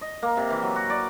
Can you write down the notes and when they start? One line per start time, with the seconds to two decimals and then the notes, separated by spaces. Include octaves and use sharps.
0.01 D#5
0.23 A#3
0.37 C3
0.50 E3
0.63 F#3
0.76 F#4
0.90 D5